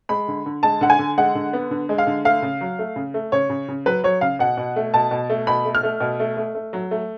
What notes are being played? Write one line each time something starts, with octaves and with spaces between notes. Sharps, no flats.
G#3 B5
D3
D3
G#3 A5
D3 F#5
G#5
D3
G#3 F#5
D3
B3
D3
G#3
F5
D3
A3 F5
C#3
F#3
A3
C#3
A3
C#3 C#5
C#3
C#3
F#3 B4
F#3 C#5
C#3 F5
B2 F#5
B2
A3
B2 A5
B2
A3
B2 B5
A3
F6
A3
B2
A3
A3
A3
F#3
A3